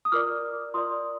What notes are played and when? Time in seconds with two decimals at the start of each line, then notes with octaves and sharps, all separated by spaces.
0.05 D#6
0.12 F4 A#4 D5 D6 F6
0.74 F4 A#4 D5 C6 D#6